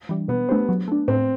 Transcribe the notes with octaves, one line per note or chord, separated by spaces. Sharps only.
E3 G3 D4
B2 B3
A3 D4 G4 C5
F#3
A3 D4
A2 C4